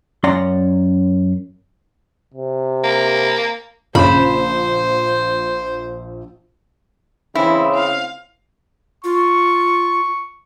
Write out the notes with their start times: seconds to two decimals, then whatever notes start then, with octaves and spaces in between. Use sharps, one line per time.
0.24 F#2 C#4 D5 F#5 A#5 C6
2.34 C3
2.84 A#3
3.95 A#1 C#3 C5 B5 E7
7.35 C#3 E3 C4 E4
7.75 F5
9.04 F4 C#6